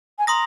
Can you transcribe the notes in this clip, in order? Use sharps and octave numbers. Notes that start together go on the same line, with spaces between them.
G#5
A#5 C6 D#6 A#6